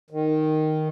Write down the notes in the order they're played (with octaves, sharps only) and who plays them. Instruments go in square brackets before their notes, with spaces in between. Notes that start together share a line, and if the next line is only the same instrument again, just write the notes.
[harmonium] D#3